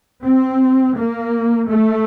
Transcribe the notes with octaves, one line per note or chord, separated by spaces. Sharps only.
C4
A#3
A3